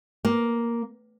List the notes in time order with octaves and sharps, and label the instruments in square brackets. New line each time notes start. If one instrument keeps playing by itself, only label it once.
[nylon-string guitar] A#3